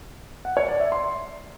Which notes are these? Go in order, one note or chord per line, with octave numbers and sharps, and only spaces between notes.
F#5
C#5
D5
E5
C6